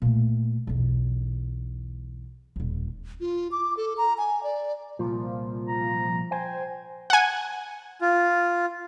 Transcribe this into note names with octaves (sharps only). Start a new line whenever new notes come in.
A#2 A3
B1 E2
D#1 D#2
F4
D6
A4
A#5
G#5
D5
C2 A#2 F3
A#5
C5 G5 G#5
F#5 G#5
F4